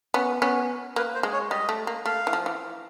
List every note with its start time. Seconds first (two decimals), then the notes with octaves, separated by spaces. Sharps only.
0.14 B3 C#4
0.42 B3 C#4
0.96 A#3 B4
1.14 C5
1.23 G#3
1.33 C#5
1.50 G3 D#5
1.69 A3
1.87 A#3
2.06 A3 F5
2.27 E3
2.33 F3
2.46 E3